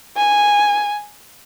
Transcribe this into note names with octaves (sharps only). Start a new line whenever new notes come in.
G#5